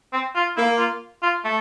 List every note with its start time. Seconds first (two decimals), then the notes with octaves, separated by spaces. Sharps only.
0.13 C4
0.36 F4
0.57 A#3 E4
0.78 F4
1.23 F4
1.45 A3